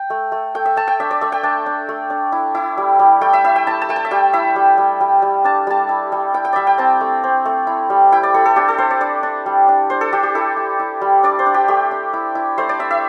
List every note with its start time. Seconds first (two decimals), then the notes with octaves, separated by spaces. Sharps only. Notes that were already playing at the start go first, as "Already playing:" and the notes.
Already playing: G5
0.10 A3
0.32 A3
0.55 A3 G5
0.65 E5
0.77 A3 A5
0.88 G5
1.00 D4 E5
1.11 D5
1.21 A3 E5
1.32 G5
1.43 D4 A5
1.66 D4
1.89 A3
2.10 D4
2.32 E4
2.55 E4
2.78 G3
2.99 G3
3.21 A3 G5
3.33 E5
3.44 E4 E5
3.56 G5
3.67 E4 A5
3.82 A5
3.89 A3 G5
3.96 A5
4.05 E5
4.11 G3 G5
4.33 E4 E5
4.56 G3
4.78 G3
5.01 G3
5.22 G3
5.44 D4 A5
5.67 G3 A5
5.89 E4
6.12 G3
6.34 E4 G5
6.45 G5
6.53 G3 D5 E5
6.67 G5
6.78 C4 A5
7.01 A3
7.24 C4
7.46 A3
7.67 E4
7.90 G3
8.12 E4 G5
8.23 D5
8.34 E4 A4
8.45 A4
8.56 D4 G4
8.68 A4
8.78 D4 C5
8.91 D5
9.01 D4 D5
9.23 D4
9.46 G3
9.69 D4
9.90 D4 C5
10.01 A4
10.13 D4 G4
10.23 G4
10.35 E4 A4
10.57 E4
10.80 E4
11.01 G3
11.23 D4 D5
11.39 C5
11.46 D4
11.54 G4
11.68 A3 G4
11.91 D4
12.13 E4
12.35 E4
12.58 A3 C5
12.69 D5
12.79 E4 E5
12.91 E5